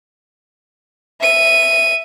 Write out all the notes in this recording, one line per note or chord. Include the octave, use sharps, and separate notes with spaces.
E5 D#7